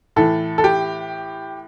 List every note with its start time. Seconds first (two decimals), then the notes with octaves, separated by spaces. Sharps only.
0.16 A2 E3 A4
0.58 A4
0.64 G4